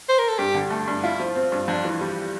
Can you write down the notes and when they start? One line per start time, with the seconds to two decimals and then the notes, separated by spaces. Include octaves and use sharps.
0.09 C5
0.19 A#4
0.28 A4
0.38 G2 G4
0.55 D3
0.71 A3
0.88 G2
1.03 E4 F4
1.20 F3
1.35 C4
1.52 G2
1.68 F2 D4
1.85 E3
2.01 G3